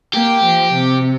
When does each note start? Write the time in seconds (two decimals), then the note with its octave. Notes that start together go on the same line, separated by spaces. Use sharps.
0.13 A#3 G4
0.45 F3
0.73 C3